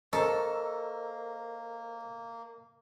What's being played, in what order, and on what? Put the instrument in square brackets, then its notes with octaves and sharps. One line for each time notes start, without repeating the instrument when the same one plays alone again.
[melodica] A#3 [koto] A4 [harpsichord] A#4 C5 [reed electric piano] D#5 C#6